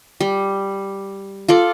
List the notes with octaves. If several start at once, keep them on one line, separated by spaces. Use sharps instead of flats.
G3
F4 A4 D5